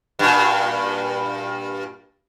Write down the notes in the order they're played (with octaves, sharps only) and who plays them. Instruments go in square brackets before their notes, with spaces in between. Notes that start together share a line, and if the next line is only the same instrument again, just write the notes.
[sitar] G2 A#2